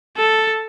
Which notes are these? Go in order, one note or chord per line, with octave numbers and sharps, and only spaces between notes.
A4